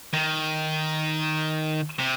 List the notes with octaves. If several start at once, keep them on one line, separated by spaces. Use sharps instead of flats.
D#3
C3